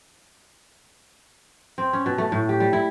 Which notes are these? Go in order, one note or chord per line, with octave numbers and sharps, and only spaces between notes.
C4
C#4
B2
A3
A2
G4
G3
E4